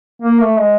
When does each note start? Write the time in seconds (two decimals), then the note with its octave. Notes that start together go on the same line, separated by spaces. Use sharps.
0.22 A#3
0.41 A3
0.59 G#3